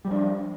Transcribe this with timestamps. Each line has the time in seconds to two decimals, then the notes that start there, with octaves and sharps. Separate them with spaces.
0.05 G3
0.08 F3
0.11 D4